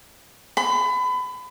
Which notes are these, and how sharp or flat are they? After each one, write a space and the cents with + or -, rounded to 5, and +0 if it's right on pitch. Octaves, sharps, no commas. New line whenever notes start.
B5 +30